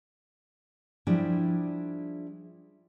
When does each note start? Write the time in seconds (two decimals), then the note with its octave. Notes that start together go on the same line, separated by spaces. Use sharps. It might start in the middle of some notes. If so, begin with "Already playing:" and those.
1.07 F3 G3 D4 E4 G#4 G5